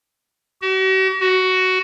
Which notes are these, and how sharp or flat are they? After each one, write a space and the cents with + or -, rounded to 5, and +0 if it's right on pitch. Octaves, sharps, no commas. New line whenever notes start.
F#4 +45
F#4 +10